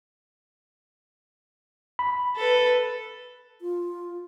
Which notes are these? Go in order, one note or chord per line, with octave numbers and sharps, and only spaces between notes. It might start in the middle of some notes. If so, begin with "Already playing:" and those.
B5
A4 B4
F4